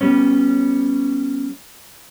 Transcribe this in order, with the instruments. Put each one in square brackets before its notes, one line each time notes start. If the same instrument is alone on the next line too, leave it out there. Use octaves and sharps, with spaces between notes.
[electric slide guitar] G3 B3 C#4